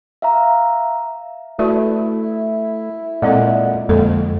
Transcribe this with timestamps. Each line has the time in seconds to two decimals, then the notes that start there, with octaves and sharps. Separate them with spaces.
0.22 E5 F5 A#5
1.59 A3 E4 F#4 B4 D5
3.22 A#2 G#3 C4 A4 D5 D#5 F#5
3.89 F2 D3 G#3 A#3 A4